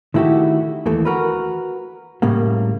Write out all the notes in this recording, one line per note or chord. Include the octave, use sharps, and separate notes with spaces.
D#3 A3 E4 F#4 G4
D#2 E3 A3 A4
F#4 A#4 B4
A2 C#3 G3 A#3